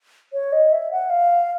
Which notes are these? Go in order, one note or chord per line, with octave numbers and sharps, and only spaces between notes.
C#5
D#5
E5
F#5
F5